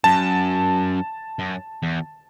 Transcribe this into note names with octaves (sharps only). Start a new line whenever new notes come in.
F#2 A5
F#2
E2